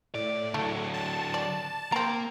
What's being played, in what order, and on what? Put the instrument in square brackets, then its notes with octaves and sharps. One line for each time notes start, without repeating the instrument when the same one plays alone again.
[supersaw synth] A2 [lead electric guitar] D5
[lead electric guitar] D3 F#3 [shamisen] A3
[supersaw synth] A5
[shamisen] D5
[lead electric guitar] A#3 [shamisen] C4 A#5